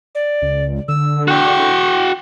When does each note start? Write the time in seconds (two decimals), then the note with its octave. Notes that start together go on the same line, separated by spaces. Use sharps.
0.15 D5
0.42 C#2
0.88 D3 E6
1.28 F#4 G5 C#6